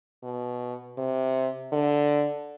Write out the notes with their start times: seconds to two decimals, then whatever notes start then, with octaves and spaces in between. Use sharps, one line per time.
0.23 B2
0.98 C3
1.73 D3